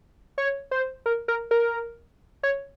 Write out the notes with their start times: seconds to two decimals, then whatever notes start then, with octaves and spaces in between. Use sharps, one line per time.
0.38 C#5
0.71 C5
1.06 A#4
1.28 A#4
1.51 A#4
2.43 C#5